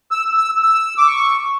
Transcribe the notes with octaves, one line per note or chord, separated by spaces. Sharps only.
E6
E6
E6
D6
C#6